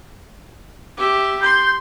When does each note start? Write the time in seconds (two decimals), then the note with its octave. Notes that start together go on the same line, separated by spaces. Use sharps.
0.97 G4 E5
1.42 C6 G6